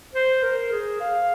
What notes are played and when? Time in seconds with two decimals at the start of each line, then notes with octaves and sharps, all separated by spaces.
0.14 C5
0.43 A#4
0.71 G#4
1.01 F5